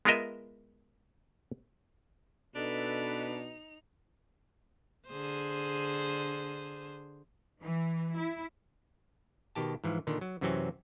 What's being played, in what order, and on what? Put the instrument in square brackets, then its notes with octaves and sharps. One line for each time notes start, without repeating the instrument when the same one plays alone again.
[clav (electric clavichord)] G#3 B3 F4 A#4 D#5 E5
[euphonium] B2 [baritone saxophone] D4 [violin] D#4 F7 [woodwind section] A4 B4
[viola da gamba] D3 G#4 C5
[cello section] E3
E4
[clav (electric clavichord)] B2 D#3 G4 A5
G#2 E3 F3
A#2 D3 D#3
F#3
F#2 C3 E3 F#3 C4 C#4